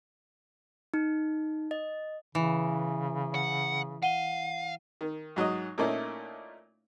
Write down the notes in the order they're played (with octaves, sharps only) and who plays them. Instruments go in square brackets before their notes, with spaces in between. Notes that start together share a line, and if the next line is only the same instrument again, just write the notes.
[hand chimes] D#4
D#5
[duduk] C#3 [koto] E3
[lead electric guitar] F#5
[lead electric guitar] F5 [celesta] F#5 D#7 G7
[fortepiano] D#3
G#2 F#3 D#4 D#5
A#2 A3 A#3 C#4 D#4 E4